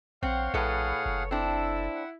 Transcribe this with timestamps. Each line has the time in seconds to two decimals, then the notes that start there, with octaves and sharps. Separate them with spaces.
0.23 A#1 C4 C#5 F5 F#5
0.54 A#1 A2 G#4 A4 B4 F5 F#5
1.06 F#1
1.31 C4 D4 E4 A4 E6
1.95 F#5